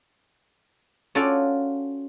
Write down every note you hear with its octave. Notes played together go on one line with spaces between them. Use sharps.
C#4 F4 F#4 A4 D5